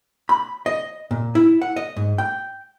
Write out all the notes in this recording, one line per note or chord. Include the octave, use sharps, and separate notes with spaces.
B5
D#5
A#2
E4
F#5
D#5
G#2
G5